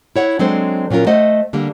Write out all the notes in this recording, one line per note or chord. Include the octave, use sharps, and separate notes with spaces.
E4 C#5 F#5
F#3 G#3 C4 D4 A4 C5
A#2 F#3 C#4 F4 A#4
A3 C5 D#5 F#5
D3 G3 A#3